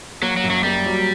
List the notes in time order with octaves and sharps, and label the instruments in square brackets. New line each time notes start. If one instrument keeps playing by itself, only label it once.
[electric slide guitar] F#3 [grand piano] A#3
[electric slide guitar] F#3
[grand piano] F#2
[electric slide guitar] F#3
[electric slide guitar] G3 [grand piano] A#3
[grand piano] F#3